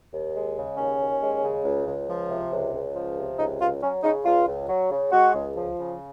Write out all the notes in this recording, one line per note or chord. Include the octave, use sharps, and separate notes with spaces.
D#2
G#3
C#3
D#2 C#4
D#2
G#3
C#3
C#2
C#2
F3
C3
C#2
C#2
F3
C3
C#2 D#4
C#2 F4
F#3 C#4
C#3 D#4
C#2 F4
C#2
F#3
C#3
G#3 F#4
C#2
F3
C#3